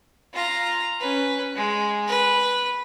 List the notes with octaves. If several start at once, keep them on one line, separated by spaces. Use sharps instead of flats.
F4 A#5
C#4 B4
G#3
B4